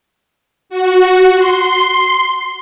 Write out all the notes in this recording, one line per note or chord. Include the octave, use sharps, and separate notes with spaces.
F#4
C6